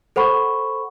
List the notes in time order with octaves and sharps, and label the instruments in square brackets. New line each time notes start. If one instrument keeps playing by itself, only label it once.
[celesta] A4 C5 F#5 B5 C#6